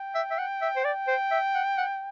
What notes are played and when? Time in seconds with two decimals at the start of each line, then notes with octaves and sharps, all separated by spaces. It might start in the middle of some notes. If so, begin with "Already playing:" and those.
Already playing: G5
0.15 E5
0.31 E5
0.38 F#5
0.62 E5
0.77 C5
0.84 D5 G5
1.08 C5
1.32 E5
1.55 F#5
1.78 F#5